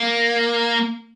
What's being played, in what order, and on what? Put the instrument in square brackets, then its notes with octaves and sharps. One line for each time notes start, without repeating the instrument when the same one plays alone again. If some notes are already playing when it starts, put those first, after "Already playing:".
Already playing: [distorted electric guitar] A#3